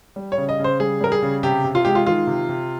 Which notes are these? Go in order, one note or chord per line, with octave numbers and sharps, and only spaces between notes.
G3
C#5
C#3
D#5
C#3 C5
G3 G#4
G3 A#4
G#4
C#3
C3 G4
C3
F4
G#3 G4
F4
D#3 F4
C3
C3